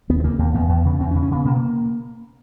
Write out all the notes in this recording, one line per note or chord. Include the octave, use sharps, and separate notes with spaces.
D#2 B3
B3
C#3 A#3
D#2 A#3
E2 B3
E2
C#3
E2 C4
C#4
C#3
C#4
C#3 B3
B2 A#3